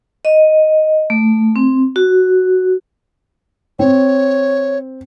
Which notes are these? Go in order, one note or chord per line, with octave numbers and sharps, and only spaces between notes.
D#5
A3
C4
F#4
C4 C#5